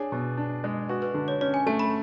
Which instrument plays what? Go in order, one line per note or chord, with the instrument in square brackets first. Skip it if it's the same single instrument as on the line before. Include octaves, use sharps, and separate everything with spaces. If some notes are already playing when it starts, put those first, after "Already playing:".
Already playing: [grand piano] D4 G#4 [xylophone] C#5
[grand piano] B2
D4
G#3
[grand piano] F#4 [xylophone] B4
[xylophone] B4
[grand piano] D3
[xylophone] C#5
[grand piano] C#4 [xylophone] C#5
[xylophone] G#5
[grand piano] A3 [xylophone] A5
[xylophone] B5